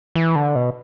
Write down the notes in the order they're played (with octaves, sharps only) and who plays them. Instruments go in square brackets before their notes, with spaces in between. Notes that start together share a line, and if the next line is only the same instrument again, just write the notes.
[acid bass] E3
D3
B2